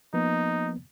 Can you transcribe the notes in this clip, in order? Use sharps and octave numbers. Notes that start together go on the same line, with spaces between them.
F3 A#3 B3 D#4